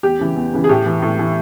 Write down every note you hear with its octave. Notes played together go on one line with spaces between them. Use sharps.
E2 G4
C#3 E3
E2
C#3 E3
G#4
A2 G4
E3
A2
E3